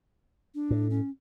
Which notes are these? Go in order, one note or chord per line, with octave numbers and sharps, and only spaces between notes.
D4
A2
C#4